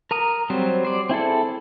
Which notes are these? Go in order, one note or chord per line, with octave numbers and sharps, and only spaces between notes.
A#4 A#5 D#6
F#3 G3 C4 C5
C5 D5
C4 E4 G#4 A4